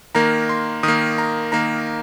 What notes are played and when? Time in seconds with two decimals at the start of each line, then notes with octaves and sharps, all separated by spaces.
0.15 D#3 A#3 A#5
0.49 C6
0.83 D#3 A#3 D#6
1.18 A#5
1.52 D#3 A#3 A#5